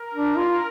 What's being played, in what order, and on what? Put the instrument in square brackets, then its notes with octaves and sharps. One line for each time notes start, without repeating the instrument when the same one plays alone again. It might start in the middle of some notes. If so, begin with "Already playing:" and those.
Already playing: [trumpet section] A#4
[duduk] D4
F4